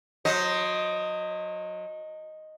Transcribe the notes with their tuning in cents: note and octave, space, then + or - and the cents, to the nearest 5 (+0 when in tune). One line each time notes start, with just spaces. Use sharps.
F#3 -30 C5 -5 D#5 +0